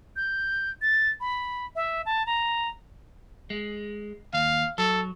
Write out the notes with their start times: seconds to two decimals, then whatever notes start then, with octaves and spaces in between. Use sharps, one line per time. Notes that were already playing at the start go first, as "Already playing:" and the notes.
0.16 G6
0.82 A6
1.21 B5
1.76 E5
2.06 A5
2.26 A#5
3.50 G#3
4.33 D#2 F5
4.78 F#3 A4